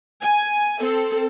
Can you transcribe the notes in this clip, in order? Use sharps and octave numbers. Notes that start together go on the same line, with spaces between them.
G#5
C4 A4